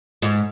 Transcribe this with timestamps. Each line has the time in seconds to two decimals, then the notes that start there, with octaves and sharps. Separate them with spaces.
0.22 G#2